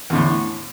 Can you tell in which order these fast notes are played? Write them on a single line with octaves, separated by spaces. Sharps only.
E2 D3 A2